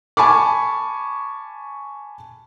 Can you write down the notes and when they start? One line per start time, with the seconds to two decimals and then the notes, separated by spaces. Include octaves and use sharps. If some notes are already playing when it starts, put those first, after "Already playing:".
0.17 G#5 A5 B5 C#6 D6